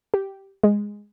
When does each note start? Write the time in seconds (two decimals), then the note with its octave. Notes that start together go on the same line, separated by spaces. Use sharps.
0.14 G4
0.63 G#3